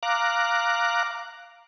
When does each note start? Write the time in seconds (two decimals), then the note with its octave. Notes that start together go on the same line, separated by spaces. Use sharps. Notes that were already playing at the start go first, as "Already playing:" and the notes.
0.03 F5 A#5 D6 F#6